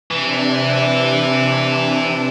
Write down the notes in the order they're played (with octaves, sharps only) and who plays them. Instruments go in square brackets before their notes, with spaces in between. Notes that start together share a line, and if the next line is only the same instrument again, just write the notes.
[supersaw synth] C3 D4 [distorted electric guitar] E3